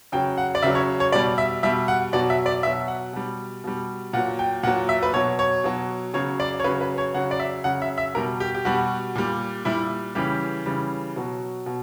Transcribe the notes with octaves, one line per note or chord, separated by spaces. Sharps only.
C#3 F#3 G5
F#5
D5
C#3 F#3 E5
C#5
C#5
B2 G3 D5
E5
B2 G3 E5
F#5
B2 F#3 D5
E5
D5
B2 F#3 E5
F#5
B2 G3
B2 G3
A#2 F#3 F#5
G5
A#2 F#3 F#5
E5
B4
B2 F#3 C#5
C#5
B2 F#3
C#3 F#3 C#5
D5
C#5
C#3 F#3 B4
B4
C#5
C#3 F#3 F#5
D5
E5
C#3 F#3 F#5
E5
E5
B2 G3 A#4
G4
G4
B2 G3 F#4
A#2 G3
A#2 G3 E4
C#3 E3 G3 G4
C#3 E3 G3
B2 F#3
B2